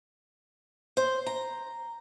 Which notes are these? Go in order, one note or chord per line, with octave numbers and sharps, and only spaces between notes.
C5
A#5